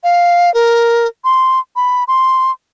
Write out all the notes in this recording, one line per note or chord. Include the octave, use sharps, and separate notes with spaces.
F5
A#4
C6
B5
C6